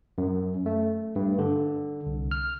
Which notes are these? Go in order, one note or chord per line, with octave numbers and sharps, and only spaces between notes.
F#2
A3
G2
D3
C2
F6